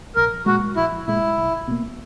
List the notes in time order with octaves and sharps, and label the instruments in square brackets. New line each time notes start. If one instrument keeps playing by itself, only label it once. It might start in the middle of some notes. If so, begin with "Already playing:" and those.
[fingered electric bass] A#1 [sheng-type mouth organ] A#4
[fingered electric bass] A#2 G#3 [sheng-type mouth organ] F#4
[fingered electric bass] A#1 [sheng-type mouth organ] E4
[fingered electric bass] A#2 G#3 [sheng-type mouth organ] E4
[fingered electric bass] B1
B2 A#3